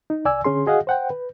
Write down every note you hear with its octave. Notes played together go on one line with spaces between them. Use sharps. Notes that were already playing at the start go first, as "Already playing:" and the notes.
D#4
C2 D5 G#5 E6
D3 C#4 G#4 C6
F#4 G#4 D#5 F5 F#5
C5 F#5 G5
B4